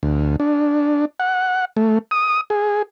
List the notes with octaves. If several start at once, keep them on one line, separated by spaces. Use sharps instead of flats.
D2
D4
F#5
A3
D#6
G#4